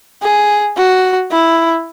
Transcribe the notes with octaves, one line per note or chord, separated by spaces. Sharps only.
G#4
F#4
E4